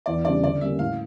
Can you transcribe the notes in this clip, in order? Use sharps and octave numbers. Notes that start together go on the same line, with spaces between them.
E2 D5
C#3 G3 D4 D5
D3 D5
G3 A#3 C#4 E5
A2 F5